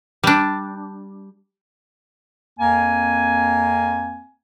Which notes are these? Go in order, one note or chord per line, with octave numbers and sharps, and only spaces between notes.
G3 D4
F2 A#3 C4 G#5